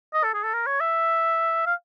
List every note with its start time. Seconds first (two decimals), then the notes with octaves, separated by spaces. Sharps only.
0.13 D#5
0.24 A4
0.34 G#4
0.44 A4
0.54 A#4
0.67 C#5
0.80 E5
1.67 F5